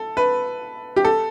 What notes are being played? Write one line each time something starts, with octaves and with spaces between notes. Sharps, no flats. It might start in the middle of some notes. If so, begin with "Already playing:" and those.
Already playing: A4
B4
G4
A4